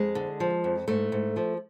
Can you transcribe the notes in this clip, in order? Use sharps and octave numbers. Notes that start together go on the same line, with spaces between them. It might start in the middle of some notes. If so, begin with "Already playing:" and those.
Already playing: F2 G#3
D3
F3
F2
G#2 A3
G#2
F3